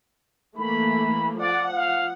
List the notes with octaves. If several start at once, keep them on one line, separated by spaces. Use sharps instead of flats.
E3 A3 A#3 B5
F3 D5 F#5
F5